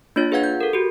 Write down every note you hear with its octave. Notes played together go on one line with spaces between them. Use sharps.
A#3 D4 F4 C#5 A6
F4 G#4 B4 F5 F#5 G#6
G6
A4 A#4
F#4 G4